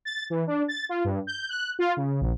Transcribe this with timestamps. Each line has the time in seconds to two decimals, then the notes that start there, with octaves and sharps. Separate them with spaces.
0.05 A6
0.30 E3
0.47 D4
0.68 A6
0.89 F4
1.04 G2
1.27 G6
1.49 F#6
1.79 F4
1.97 C#3
2.21 A#1